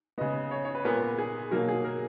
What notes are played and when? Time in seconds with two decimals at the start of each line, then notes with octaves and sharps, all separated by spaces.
0.18 C#3 G#3 B3 D#5
0.51 C#5
0.65 C#5
0.75 B4
0.85 A#2 G#3 B3 A#4
1.18 G#4
1.51 B2 F#3 A#3 A#4
1.68 G#4
1.85 A#4